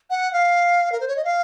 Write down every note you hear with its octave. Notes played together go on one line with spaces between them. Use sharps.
F#5
F5
A#4
C5
C#5
D#5
F5